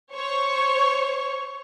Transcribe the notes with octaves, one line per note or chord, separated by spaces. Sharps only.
C5 C#5 C#6